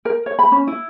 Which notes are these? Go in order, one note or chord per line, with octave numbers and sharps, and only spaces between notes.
A#4
C#5
B5
C#4
E4